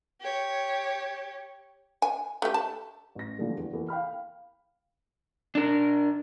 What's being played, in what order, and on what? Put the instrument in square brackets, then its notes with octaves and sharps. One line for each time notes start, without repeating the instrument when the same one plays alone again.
[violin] G4 C#5
[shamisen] G#5
A3 G4
A5
[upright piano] A1 A#6
A#2 D3 E3 F3 G3 A3
E2
E2 E3 A#3 A4 A#4
F5 G5 B5 F6
[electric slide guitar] D4 A#4